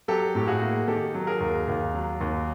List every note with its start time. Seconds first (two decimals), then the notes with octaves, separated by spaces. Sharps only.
0.08 F#3 G4 A4
0.35 A2 G4
0.48 F#4 G#4
0.61 A#3
0.88 D#3 G4 A4
1.14 F#3
1.27 G#4 A#4
1.40 D#2
1.68 D#2
1.94 F#3
2.21 D#2